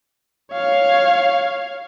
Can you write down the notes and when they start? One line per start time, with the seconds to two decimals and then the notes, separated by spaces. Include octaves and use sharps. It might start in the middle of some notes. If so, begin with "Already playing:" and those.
0.52 C#5 F5